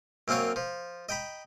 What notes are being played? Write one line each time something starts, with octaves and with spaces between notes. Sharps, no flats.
F#2 A#3 C4 F4 C#5
F3
D#5 G5 A#5 B5